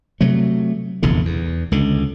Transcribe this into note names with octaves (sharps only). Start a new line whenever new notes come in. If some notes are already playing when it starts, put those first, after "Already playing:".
C3 F#3 A3
F1 A#1 E2 D3
E2
C#2 D3